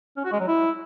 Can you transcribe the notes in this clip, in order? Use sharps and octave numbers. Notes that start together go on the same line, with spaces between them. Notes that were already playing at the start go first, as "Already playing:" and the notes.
C#4
F#4
G#3
F#3
E4